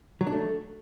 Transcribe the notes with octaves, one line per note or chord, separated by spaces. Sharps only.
F#3
D4
A3